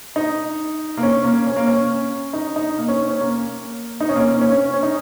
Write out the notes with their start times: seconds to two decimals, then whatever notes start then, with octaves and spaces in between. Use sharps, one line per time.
0.16 D#4
0.97 A#3
1.03 C#4
1.24 A#3
1.47 C#4
1.56 A#3
1.66 C#4
2.33 D#4
2.56 D#4
2.78 A#3
2.88 C#4
3.10 C#4
3.21 A#3
4.00 D#4
4.09 C#4
4.16 A#3
4.20 C#4
4.31 A#3
4.41 C#4
4.52 C#4
4.74 C#4
4.83 D#4